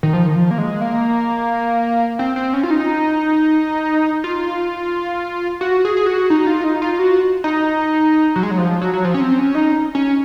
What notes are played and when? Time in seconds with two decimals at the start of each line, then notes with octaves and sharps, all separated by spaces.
0.03 D#3
0.13 F3
0.26 D#3
0.35 F3
0.51 A#3
0.58 G#3
0.81 A#3
2.19 C4
2.36 C4
2.53 C#4
2.63 F4
2.70 D#4
4.24 F4
5.61 F#4
5.85 G#4
5.97 G#4
6.06 F#4
6.30 D#4
6.47 F4
6.64 D#4
6.82 F4
6.99 F#4
7.44 D#4
8.36 F#3
8.43 G#3
8.51 F#3
8.58 F3
8.81 F#3
8.93 F#3
9.05 F3
9.14 C#4
9.21 C4
9.39 C#4
9.55 D#4
9.95 C#4